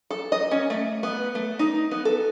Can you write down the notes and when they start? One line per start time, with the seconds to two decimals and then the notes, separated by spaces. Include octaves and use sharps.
0.11 A4
0.32 D#5
0.51 C#4
0.70 A3
1.03 B3
1.35 A3
1.59 D#4
1.91 B3
2.05 A4